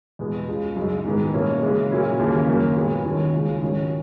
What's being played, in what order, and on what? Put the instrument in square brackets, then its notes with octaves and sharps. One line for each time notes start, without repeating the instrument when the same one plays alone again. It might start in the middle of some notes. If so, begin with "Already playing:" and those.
[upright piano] E2 B2 G#3 B3
C#2 C#3 G#3
F#2 C#3 G#3 D#4
G#2 D#3 G#3 B3
B2 A#3 C#4 E4
C#3 E3 G#3
A#2 F#3 A#3 C#4 E4
D#2 C#3 E3 A#3 C#4
F#2 D#3 A#3 C#4
A#2 G#3 B3
D#2 D#3 F#3 C#4
C#2 C#3 G#3
G#2 D#3 F#3 C#4